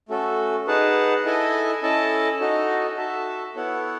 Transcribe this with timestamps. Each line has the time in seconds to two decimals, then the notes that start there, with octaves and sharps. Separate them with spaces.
0.09 A3 C#4 F#4 A4
0.67 D#4 G#4 B4 F#5 A5
1.25 E4 A4 D#5 G#5
1.82 C#4 E4 A4 D#5 A5
2.40 D#4 F#4 A4 D#5
2.97 F#4 A4 E5 A5
3.56 B3 E4 A4 C#5 F#5